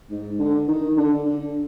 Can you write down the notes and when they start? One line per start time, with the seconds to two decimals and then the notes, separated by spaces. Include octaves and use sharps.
0.10 G#2
0.39 D3
0.68 D#3
0.97 D3
1.25 D3